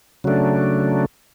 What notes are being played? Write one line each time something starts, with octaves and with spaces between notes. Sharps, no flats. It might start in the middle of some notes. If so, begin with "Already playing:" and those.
C#3 F#3 A3 D4